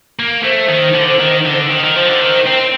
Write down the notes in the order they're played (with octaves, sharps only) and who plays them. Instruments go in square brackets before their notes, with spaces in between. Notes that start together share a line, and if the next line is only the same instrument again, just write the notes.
[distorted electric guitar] A#3
[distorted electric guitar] A3 [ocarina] C5
[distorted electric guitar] D#3
D3
D#3
D3
D#3
D#3
[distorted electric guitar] F3 [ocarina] C5
[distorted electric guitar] D3
D#3
C4